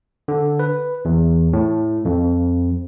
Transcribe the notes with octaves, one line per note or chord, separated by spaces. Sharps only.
D3
B4
E2
A2
F2